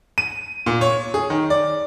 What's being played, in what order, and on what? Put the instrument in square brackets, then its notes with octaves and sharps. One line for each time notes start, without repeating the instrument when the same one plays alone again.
[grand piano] D#7
A#2
C#5
G#4
D#3
D5